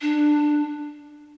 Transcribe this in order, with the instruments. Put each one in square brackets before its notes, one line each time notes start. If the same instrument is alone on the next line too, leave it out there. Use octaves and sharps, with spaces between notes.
[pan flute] D4